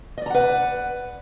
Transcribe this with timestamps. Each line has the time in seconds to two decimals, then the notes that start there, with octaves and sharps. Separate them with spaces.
0.18 D#5
0.22 D5
0.26 A#5
0.30 F#5
0.35 B4